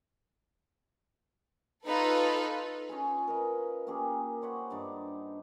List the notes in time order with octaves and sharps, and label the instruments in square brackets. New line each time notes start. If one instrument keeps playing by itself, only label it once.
[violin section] D#4 F4 A4 B4
[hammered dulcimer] C#4 F4 G#4
A#4 B4 D#5
A#3 C#4 G4 G#4
C5 C#5 F#5 B5
G2 D4 D#4 D6